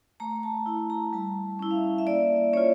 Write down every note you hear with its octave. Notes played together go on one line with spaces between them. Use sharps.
A3 A#5
A5
E4 A5
A#5
G3 A5
C#4 E4
F5
E5
E5
A#3 D5
C#4 F4 C#5